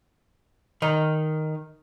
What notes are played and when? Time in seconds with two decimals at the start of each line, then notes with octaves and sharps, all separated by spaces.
0.82 D#3 D#4